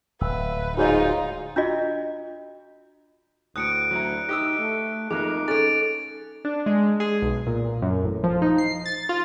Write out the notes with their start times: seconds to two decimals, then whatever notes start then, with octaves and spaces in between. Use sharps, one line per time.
0.21 D1 B4 E6
0.77 G#2 D#4 F4 F#4 C#5 D#5
1.56 D4 F4 F#4 D#5
3.56 D2 A2 D#6 F#6 C#7 D7
3.91 F#3 E4 A#5
4.29 D#4 G4 D#6 E6
4.59 A3
5.11 F2 A#3 D#4 G#4 D6 F#6
5.48 C#4 G#4 A4 A6 D7
6.45 D4
6.66 G#3
7.00 G#4
7.22 B1
7.47 A#2
7.82 F#2
8.04 A1
8.24 F3
8.42 D#4
8.58 C7
8.86 A6
9.09 F4